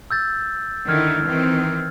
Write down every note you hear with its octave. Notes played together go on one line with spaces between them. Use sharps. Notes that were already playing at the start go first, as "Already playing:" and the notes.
E6 G6 A6
D3 D#3 E4 F6 G#6
D#3 E3 C4